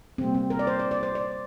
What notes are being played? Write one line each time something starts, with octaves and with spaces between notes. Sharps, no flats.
C3 G3 A#3 C4
C4
A#4
D5
C5
D5
D5
C5
D5